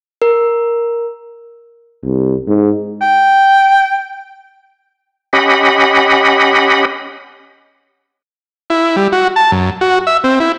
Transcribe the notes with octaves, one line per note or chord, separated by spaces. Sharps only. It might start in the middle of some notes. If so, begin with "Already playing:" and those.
A#4
C2
G#2
G5
C#4 G4 D#5 F#5 B5
E4
G3
F#4
A5
F#2
F#4
E5
C4
E4